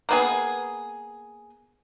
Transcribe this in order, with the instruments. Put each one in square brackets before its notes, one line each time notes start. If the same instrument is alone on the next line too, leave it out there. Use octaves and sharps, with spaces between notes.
[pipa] A#3 B3 G#4